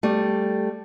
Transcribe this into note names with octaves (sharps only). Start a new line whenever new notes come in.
G3 A3